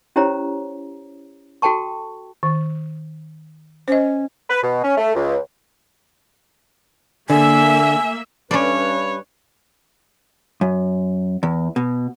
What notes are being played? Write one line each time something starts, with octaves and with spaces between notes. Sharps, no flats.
C#4 E4 G4 C5 C#5 A#5
F#4 A4 G5 A5 C#6
D#3
C#4 C5 D#5
B4
B2
C#4
A3
C#2
D3 A#3 E5 G#5
G2 C#4 B4 C#5 D5
F#2
E2
B2